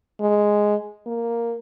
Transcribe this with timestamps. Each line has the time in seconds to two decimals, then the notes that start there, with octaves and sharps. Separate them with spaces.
0.20 G#3
1.07 A#3